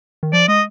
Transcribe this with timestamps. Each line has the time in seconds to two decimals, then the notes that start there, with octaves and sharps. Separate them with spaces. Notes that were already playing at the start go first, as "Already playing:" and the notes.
0.23 D#3
0.33 F3 D5
0.48 G#3 D#5